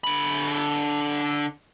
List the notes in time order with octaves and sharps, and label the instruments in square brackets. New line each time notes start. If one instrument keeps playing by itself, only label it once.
[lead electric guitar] D3 B5